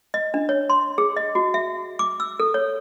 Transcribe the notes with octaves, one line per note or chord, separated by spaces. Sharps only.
D#5
D4
C#5
C6
G#4
D#5
F#4
E5
D6
E6
A4
C#5